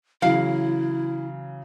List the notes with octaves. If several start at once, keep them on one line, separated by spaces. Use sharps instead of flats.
C#3 E3 F#3 E4 F5